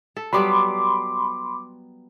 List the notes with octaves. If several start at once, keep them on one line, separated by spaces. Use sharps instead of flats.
A4
F#3 G3 B3 B5 C6 D6